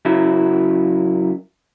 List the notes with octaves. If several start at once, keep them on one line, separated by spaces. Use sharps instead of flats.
F#2 C#3 F#3 E4